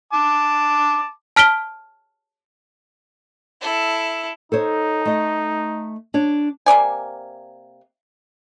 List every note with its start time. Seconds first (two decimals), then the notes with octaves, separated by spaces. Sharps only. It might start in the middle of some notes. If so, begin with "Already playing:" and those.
0.13 A5 D6
1.36 A5 F6 B6 D7 G7
3.62 E4 A4
4.52 D#4 A4 C5 C#5
5.05 A3 D#5
6.14 D4 C#5
6.66 C3 A#3 D5 G#5